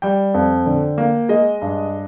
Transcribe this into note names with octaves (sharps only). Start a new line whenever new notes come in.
G3 G5
F2
D3
A#3
G#3 D#5
G2